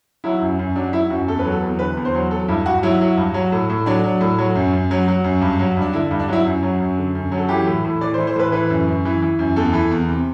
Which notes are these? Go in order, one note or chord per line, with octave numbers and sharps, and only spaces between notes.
F#3 E4
F#2
F#2
F#3 D4
F#3 E4
F#2 F#4
E2 A4
B4
F#3
A4
E2
D3 B4
E2
C5
F#3
F#3 A4
G2 E4
G2 F#4
F#3 E4
F#3
G2
F#3
A2
A2
F#3 D4
F#3
A2
F#3
F#2
F#2
F#3
F#3
F#2
G2
F#3
G2 D4
D3 E4
G2
D4
F#3 E4
F#2
F#3
F#2
D3
F#2
F#3
A4
E3 G4
A2
A2
E3 D5
C5
E3
C5
A2 B4
E3 B4
F#2
F#2
E3
E3
F#2
E2 A4
E3
E2
C3